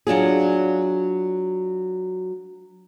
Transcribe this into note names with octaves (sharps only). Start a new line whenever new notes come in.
F#3 D4 F4 G#4